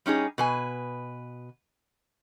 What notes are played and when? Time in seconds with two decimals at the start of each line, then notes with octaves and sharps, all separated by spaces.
0.06 G3 C#4 D#4 G#4
0.38 B2 B4 G#5